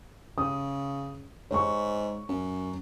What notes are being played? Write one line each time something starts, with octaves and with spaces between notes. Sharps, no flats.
C#3 D#6
G#2 C#5 C#6
F#2